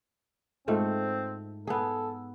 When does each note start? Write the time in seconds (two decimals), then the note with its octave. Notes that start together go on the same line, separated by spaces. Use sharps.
0.68 G#2 A3 C4 F4
1.67 B3 G#4 A4